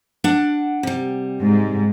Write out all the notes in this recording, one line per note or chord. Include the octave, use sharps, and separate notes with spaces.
D4 F#5
C3 G3
G#2